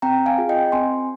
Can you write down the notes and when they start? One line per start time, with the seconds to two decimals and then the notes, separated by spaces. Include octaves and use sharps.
0.02 C4 G5 A#5
0.26 F5 G#5
0.38 F4 G#4
0.49 D#5 G5
0.72 C4 G#5 C6